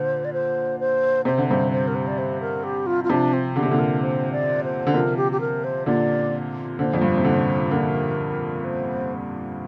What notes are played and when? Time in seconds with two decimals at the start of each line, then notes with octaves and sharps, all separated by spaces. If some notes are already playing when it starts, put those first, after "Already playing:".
Already playing: A#2 D3 C5
0.25 D5
0.33 C5
0.80 C5
1.25 C3 C5
1.38 D3
1.48 G2 C3 C5
1.72 C5
1.88 A#4
1.95 C5
2.08 D5
2.18 C5
2.41 A#4
2.64 G4
2.87 F4
3.04 F4
3.09 C3 F3 D4
3.33 C4
3.56 D3 G4
3.63 C3
3.70 A#2 D3
3.79 A#4
4.02 C5
4.32 D5
4.64 C5
4.87 D3
4.94 C3 F3 A#4
5.17 G4
5.32 G4
5.41 A#4
5.64 C5
5.86 A#2 D3 D5
6.79 A#2 D3 C5
6.94 F2
7.02 G2
7.10 A#2
7.17 C3
7.25 A#2 D3
7.71 A#2 D3 A#4
8.64 C5